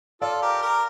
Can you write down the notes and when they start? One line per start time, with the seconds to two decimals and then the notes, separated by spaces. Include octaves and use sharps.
0.21 F4 A4 D5 F5
0.42 G4 A#4
0.62 G4 A#4